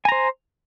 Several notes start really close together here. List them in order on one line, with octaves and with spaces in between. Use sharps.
G#5 A#5 C5